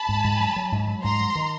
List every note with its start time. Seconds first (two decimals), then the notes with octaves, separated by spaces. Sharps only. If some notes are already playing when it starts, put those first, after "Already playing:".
Already playing: A5 B5
0.09 G#2
0.24 G#2
0.41 F#3
0.56 F#3
0.72 G#2
0.87 F#3
1.03 G#2 A#5 C6
1.20 F#3
1.35 D#3